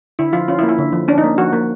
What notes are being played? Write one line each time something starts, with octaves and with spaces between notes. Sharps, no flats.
D3 E4
F3 F4
C#4 F4
E4
A#3
E4
D3
F3
C#4 D4
D#4
A#3
F3 F#4
A#3